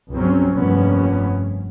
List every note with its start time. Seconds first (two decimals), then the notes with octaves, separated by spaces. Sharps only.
0.12 C#2 G2 F#3 C4 C#4
0.53 F1 G2 A#3 B3 C#4